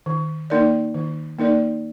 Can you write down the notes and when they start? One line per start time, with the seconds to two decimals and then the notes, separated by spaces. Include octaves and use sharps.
0.06 D#3
0.50 A#3 D#4 A#4 D5
0.94 D#3
1.39 A#3 D#4 A#4 D5